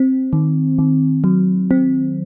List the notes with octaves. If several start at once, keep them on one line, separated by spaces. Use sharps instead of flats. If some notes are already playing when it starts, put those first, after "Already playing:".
Already playing: C4
D#3
D#3
F#3
C4